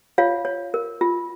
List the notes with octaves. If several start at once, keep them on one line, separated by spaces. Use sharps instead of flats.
F4 C#5 F5
C#5
A#4
F4